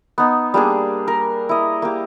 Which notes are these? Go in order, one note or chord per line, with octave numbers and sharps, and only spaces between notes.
B3 D#4
G3 A#3 D4 G#4
A#4
E4 D#5
A#3 G4